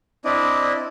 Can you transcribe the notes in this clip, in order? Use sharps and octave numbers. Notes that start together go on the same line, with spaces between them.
C4 D4 E4 D5 D#5